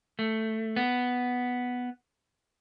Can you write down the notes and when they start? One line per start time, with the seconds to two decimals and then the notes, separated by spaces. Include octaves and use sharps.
0.19 A3
0.76 B3